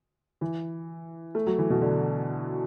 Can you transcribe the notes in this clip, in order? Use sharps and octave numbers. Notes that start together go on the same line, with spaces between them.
E3
A3
F#3
E3
B2
D3